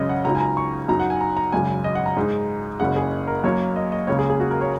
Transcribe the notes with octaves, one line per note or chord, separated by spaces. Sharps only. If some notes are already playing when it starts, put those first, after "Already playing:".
Already playing: G#1 F#2 C#3 G#3 C#4 D#5
F#5
C#2 C#3 F#3 D#4 A#5
G#5
A#5
C#6
F#2 F#3 D#4 A#5
F#5
G#5
A#5
A#5
G#1 F#2 C#3 G#5
D#5
F#5
A#5
G#2 G#3 D#4
F#1 F#2 C#3 G#3 F#5
G#4
A#4
F#2 F#3 A#3 C#5
D#5
D#5
C#2 C#3 A#3 C#5
G#4
G#4
F#4
A#4
C#5